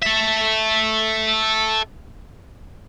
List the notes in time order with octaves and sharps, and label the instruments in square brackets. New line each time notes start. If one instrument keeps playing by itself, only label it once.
[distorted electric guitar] A4 E5